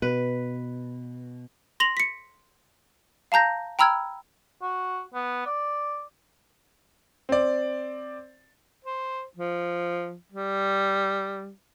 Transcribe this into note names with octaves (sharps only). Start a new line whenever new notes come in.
B2 B4
C6 A#6 F7 F#7
B6 C#7
F5 A5 A#5 G6 A#6
G5 A#5 B5 E6 F6 G#6
F#4
B3
D5
C4 D5
C5
F3
G3